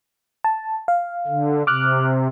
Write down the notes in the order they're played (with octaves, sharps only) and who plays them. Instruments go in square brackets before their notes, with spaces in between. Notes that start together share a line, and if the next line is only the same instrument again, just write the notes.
[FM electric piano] A5
F5
[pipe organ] D3
[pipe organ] C3 [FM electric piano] D6 F6 F#6